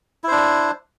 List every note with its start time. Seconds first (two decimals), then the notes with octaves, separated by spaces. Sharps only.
0.24 E4
0.28 C5
0.32 D4